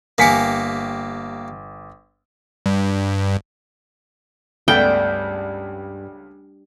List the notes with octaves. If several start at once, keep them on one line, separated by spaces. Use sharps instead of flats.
G1 A#3 G4 A#4 G#5 B6 C#7
G2
C#2 G2 A3 B3 G5